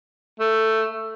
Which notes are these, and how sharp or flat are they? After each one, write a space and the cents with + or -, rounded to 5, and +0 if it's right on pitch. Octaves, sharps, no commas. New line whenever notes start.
A3 +10